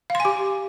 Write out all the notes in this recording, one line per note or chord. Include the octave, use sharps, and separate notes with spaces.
F5
C6
G#5
G4